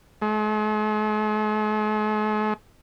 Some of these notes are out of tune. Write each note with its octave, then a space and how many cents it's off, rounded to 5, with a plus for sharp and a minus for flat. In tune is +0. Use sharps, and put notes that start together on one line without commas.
G#3 +45